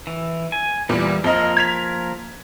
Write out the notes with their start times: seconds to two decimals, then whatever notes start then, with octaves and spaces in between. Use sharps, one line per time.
0.07 E3
0.52 G#5
0.89 E2 A#2 E3 G3
1.24 F2 F3 A#3 A#4 D#5
1.57 G#6 B6 F7